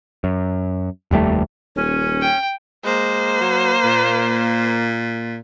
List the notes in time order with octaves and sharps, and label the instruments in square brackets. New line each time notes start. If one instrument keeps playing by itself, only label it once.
[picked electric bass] F#2
F1 D#2 G3 A3
[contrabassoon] D#1 [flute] C#4
[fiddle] G5
[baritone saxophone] G#3 [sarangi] A#3 [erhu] C5
[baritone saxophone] F#3
A#2